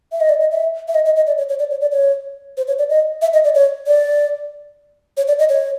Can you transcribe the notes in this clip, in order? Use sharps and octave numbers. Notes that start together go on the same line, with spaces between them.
E5
D#5
D5
D#5
E5
E5
D#5
D#5
D#5
D5
C#5
C#5
D5
C#5
D5
C#5
C5
C#5
D5
D#5
E5
D#5
D5
C#5
D5
C#5
D5
D#5
C#5